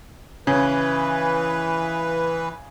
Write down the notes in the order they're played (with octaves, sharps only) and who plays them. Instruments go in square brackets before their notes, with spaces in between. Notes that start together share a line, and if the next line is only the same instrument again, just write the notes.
[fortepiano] C#3 [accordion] E3 B4